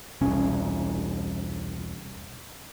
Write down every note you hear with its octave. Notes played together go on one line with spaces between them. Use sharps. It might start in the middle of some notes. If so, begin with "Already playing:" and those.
E1 C2 C#4